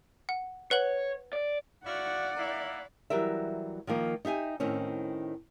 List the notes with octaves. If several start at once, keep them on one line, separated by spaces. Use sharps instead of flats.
F#5
B4 C#5 F#5 F#7
D5
E4 F#4 D5 F5 F#5
A#3 E4
E3 F#3 G3 A#4 E5
D#3 F3 A#3
D#4 G4 E5 G#5
A2 D#3 C4 C#4